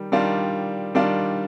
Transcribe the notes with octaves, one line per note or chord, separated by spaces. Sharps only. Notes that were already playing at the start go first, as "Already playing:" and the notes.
Already playing: D#3 G3
D#3 G3 D4 F4
D#3 G3 D4 F4